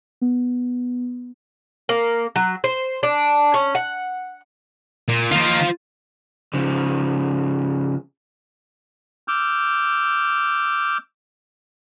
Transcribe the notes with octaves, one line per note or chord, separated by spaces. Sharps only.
B3
A#3
F#3
C5
D4
C#4
F#5
A#2
D#3 A#3 F4 C5
C#3 F3
D6 E6 F6 G6